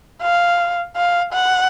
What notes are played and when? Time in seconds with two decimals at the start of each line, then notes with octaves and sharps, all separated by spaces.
0.22 F5
0.97 F5
1.33 F#5